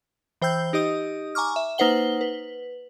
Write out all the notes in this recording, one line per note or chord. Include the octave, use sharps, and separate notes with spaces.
E3 C5 G5 E6 G6
D#4 G4 D#5 D#6
G#5 A#5 C#6 D6 F6
E5
A#3 D#4 B4 C5 F#5 G7
B4